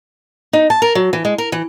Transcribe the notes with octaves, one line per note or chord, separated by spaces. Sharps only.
D#4
A5
A#4
F#3
E3
G#3
A#4
E3